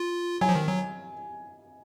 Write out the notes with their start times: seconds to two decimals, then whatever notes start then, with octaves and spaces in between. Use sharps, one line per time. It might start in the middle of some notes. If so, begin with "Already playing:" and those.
Already playing: F4
0.41 F#3 G#5
0.49 F3
0.55 D#3
0.68 F#3